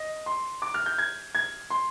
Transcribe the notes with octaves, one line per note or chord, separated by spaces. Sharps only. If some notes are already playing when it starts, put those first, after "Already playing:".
Already playing: D#5
C6
D6
F6
G6
G#6
G#6
C6